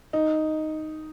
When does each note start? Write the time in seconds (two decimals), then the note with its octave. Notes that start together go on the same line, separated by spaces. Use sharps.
0.13 D#4